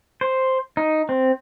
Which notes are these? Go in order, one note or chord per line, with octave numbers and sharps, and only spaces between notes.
C5
D#4
C4